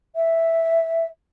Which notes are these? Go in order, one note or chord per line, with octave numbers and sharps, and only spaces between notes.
E5